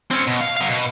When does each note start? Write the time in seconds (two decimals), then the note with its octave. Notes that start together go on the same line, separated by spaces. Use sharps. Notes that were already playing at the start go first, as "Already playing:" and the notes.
0.11 C4 C#4
0.27 B2
0.41 F5
0.57 F#3 F5
0.69 B2